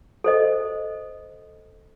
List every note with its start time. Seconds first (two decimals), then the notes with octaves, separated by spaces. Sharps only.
0.24 A4 C5 D#5